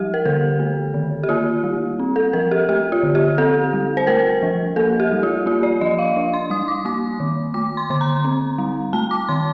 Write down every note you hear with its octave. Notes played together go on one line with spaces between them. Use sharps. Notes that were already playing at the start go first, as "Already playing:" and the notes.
Already playing: F3 G3 G4
A#4
D3 A4
A3
D#3
G4
A#3 F4
G3
C4
A4
F3 A#4
G4
A3 G4
F4
D3
G4
C4 A4
G3
C5
A3 A#4
F3
A#3 A4
G4
G3
F4
A#3 F4
D5
F3 D#5
F5
D4
C6
G3 D#6
D6
A#3 D6
D#3
A3 D6
C6
D3 C6
A#5
C4
G3
A3 A5
D6
D#3 C6